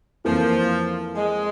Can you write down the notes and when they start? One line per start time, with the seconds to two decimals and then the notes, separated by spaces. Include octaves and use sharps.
0.25 F2 E3 F3 A#3
1.15 G#3